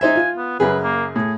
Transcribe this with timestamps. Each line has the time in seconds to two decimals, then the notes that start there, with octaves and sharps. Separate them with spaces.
0.01 D#4 C5 E5 G#5
0.16 F4
0.37 B3
0.60 F#2 C#3 G#4 B4
0.84 A#3
1.16 A2 G#4